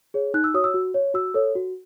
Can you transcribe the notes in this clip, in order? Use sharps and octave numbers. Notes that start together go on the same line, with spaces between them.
G#4 C#5
D#4 F#6
E6
F#4 C#5 D#6
E6
F#4
C#5
F#4 E6
A4 C#5
F#4